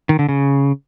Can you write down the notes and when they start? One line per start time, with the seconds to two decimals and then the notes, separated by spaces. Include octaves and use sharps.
0.09 D#3
0.19 D3
0.29 C#3